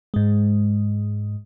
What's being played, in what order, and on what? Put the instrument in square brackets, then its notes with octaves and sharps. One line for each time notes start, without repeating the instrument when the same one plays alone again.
[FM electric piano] G#2 G#3